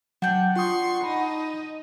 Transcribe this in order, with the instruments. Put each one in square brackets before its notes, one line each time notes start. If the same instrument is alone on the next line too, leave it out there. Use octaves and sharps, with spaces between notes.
[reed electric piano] F#3 [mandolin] D4 G5 [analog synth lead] F#5
[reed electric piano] F4 D#6 [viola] C6 C#6
[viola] D#4 [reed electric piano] B5